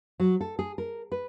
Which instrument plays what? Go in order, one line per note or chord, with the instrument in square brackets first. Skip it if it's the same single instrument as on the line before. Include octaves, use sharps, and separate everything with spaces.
[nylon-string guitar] F#3
A4
G#4
A#4
B4